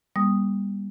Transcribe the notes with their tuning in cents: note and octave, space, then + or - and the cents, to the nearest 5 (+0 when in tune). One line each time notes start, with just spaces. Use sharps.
G3 +25 B3 -40 D#6 +0